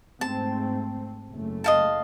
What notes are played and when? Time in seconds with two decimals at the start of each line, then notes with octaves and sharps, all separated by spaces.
0.21 G#2 A3 C4 A5
1.31 F#1 A3
1.64 D#5 F5 A5